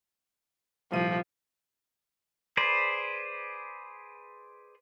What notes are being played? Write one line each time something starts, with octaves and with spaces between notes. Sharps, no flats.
D#1 C2 F3 D#7
G#4 B4 C5 D5